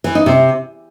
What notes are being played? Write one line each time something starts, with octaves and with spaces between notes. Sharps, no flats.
E3
D#4
C3